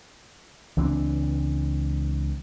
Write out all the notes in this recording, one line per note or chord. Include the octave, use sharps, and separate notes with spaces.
C#2 E3 C4 D4